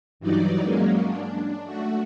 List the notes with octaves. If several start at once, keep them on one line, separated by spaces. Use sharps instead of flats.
G2 E3 F#3 D#4 D5
F#3 G#3 A#3 C#4
D4
A3 F#4